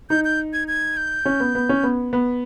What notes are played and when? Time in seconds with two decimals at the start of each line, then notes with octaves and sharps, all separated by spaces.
0.10 D#4 G6
0.24 G6
0.53 G#6
0.68 G#6
0.97 G6
1.25 C#4
1.40 B3
1.55 B3
1.69 C#4
1.83 B3
2.13 B3